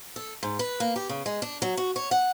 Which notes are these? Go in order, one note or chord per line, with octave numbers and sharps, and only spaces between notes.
A4
G#2
B4
A#3
G4
C#3
G#3
D4
F#3
F#4
C#5
F#5